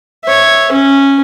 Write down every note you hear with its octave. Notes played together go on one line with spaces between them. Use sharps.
C#5 E5
C#4